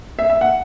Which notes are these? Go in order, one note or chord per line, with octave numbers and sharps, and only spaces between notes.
E5
E5
F#5